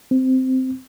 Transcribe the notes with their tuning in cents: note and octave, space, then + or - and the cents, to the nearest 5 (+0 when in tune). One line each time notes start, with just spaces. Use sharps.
C4 -10